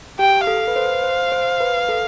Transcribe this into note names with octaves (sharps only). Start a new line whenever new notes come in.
G4 G5
A4 F5
B4
C5
C5
C5
B4
A4